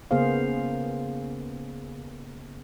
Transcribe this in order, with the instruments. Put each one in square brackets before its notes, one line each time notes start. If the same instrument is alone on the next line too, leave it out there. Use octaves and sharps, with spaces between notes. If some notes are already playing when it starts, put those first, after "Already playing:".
[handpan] C#3 A#3 B3 G#4 C5 F5